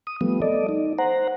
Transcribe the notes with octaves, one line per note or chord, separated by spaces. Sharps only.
D#6
F3 G3 A3 B3
A4 D5 D#5
D#4
C5 F#5 A#5